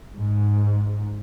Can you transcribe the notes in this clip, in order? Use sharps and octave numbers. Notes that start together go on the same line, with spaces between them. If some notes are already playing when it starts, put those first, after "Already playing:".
G#2